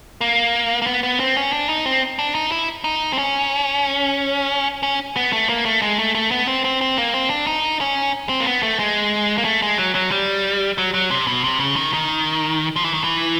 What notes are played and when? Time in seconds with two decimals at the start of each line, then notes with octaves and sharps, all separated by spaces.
0.21 A#3
0.82 A#3
0.87 B3
1.03 B3
1.20 C4
1.37 C#4
1.53 D4
1.69 D#4
1.86 C4
2.19 D4
2.35 D#4
2.52 E4
2.84 D#4
3.13 C4
3.18 C#4
4.83 C#4
5.16 B3
5.33 A3
5.49 A#3
5.66 A3
5.82 G#3
5.99 A3
6.15 A3
6.31 B3
6.48 C4
6.64 C4
6.81 C4
6.98 A#3
7.14 C4
7.30 D4
7.47 D#4
7.81 C#4
8.29 C4
8.40 A#3
8.47 B3
8.63 A3
8.79 G#3
9.38 A#3
9.45 A3
9.62 G#3
9.78 F#3
9.95 F#3
10.11 G3
10.78 F#3
10.94 F#3
11.11 C3
11.27 B2
11.44 C3
11.60 C#3
11.76 D#3
11.93 D#3
12.76 F3
12.84 E3
12.94 D#3
13.04 E3